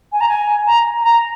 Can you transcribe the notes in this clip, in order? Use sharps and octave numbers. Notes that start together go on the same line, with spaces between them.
G#5
A#5
G#5
A#5
A#5